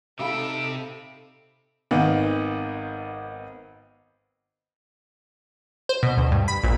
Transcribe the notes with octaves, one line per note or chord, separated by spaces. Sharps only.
C3 D#4 A4 E5 F5 G5 B5 E6
G#1 D#3 B3
C5
B2
D2
G2
B5
A#1